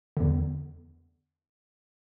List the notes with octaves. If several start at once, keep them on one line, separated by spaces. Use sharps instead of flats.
E2 D3